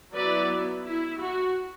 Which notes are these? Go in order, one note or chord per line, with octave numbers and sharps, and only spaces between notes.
F#3 B3 E4 B4 D5
E4
F#4